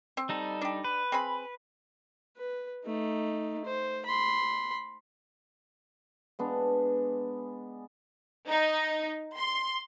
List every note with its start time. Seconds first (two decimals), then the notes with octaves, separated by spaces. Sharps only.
0.17 C4
0.29 G3 D#4 A4
0.61 D4 G4
0.84 B4
1.12 C4 G#4 B5
2.37 B4
2.85 A3 D#4
3.65 C5
4.06 B5 C6
6.39 G#3 B3 D4
8.50 D#4
9.36 C6